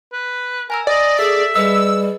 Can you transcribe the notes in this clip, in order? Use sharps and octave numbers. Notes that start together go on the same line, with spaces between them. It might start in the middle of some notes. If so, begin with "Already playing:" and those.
B4
A#4 G#5 A#5 E6
D5 D#5
G#4 A4 E5
G3 G#4 B4 D#5 E6